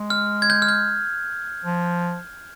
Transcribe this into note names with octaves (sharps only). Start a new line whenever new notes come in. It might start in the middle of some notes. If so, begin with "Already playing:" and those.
Already playing: G#3
F6
G#6
G6
F6
G6
F3